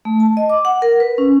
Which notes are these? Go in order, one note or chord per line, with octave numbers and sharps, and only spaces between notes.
A3
A5
D#5
D6
F#5
A#4
B4
C#4